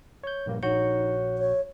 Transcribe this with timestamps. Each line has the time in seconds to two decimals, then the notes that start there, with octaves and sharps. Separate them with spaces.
0.23 C#5 G6
0.46 A#1 G2 A#3
0.63 A#1 D#4 F#4 C#5 G6
1.38 C#5